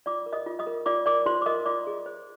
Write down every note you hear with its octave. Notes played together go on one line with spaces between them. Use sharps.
F4 D5 D6
A#4
D#5 D#6
F4
D#5 D#6
A#4
F4 D5 D6
A#4 D5 D6
F4 C5 C6
D6
A#4 D#5 D#6
F4 D5 D6
G#4
C5